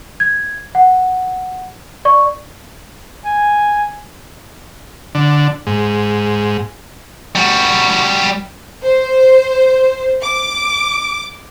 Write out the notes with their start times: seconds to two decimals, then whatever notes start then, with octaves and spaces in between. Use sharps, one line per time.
0.20 G#6
0.75 F#5
2.05 D5 C#6
3.24 G#5
5.15 D3
5.67 G#2
7.35 G3 F#4
8.83 C5
10.22 D6